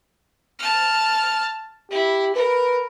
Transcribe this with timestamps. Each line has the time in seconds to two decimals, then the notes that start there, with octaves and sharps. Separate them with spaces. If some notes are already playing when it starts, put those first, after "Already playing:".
0.60 A5 F6
1.91 E4 G4
2.35 A#4 B4